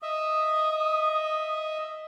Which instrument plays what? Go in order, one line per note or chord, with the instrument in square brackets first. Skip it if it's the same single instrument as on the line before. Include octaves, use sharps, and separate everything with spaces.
[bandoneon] D#5 E5 [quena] D#6